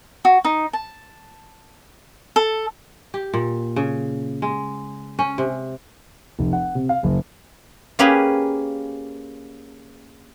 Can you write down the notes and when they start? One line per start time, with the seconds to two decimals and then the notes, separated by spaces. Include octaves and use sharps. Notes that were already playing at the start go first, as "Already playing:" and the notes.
0.25 F#4
0.45 D#4
0.73 A5
2.36 A4
3.14 G4
3.34 A#2
3.76 C#3
4.42 G#3
5.19 C#4
5.38 C3
6.39 F1
6.53 F#5
6.75 C3
6.89 F5
7.03 F#1
7.99 A#3 C#4 G4 G#4 B4